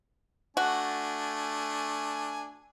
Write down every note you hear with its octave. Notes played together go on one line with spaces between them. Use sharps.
A3 D4 F#4 G#5